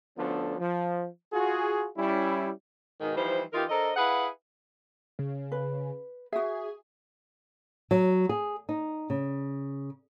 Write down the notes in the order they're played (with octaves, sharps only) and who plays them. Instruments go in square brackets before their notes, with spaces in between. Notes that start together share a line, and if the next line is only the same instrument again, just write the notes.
[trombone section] D2 F3 B3 C#4 D4 A4
F3
F4 F#4 G#4
G3 C#4 E4
[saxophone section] G#2 B2 D#3
E3 F3 G3 D#4 C5
E3 D#4 F4 G4 A#4
D4 A4 A#4 C5 D#5
E4 G#4 B4 F5 F#5
[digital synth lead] C#3
[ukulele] B4
[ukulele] F#4 E5 [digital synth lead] G#4
[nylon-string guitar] F#3
G#4
D#4
C#3